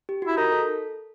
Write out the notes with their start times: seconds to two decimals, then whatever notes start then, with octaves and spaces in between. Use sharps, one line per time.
0.09 G4
0.22 F#4
0.27 E4
0.37 D#4 A#4
0.52 A4